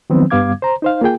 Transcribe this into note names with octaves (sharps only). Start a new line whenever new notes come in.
D#3 F3 F#3 B3 C4
G2 G3 B3 F5 D6 G#6
C5 A#5
D#4 C5 F5
A#3 F4 G#4 G5